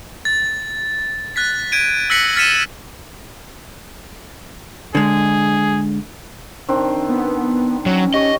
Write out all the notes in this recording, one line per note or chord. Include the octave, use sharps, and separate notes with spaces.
A6
F#6 A6 B6
G#6 D7 D#7
E6 F#6 A#6 B6 C#7 F#7
F6 A6 B6 C#7 D#7 E7
D3 G#3 G#4
D#3 C4 D4
B3
F#3 C#4
G4 C#5 D#5